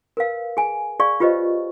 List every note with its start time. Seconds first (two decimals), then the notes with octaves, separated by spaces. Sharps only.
0.17 A#4 B4 F5
0.57 G#4 G#5
0.99 G#4 D5 F5 C#6
1.20 F4 G4 B4 C5 D#5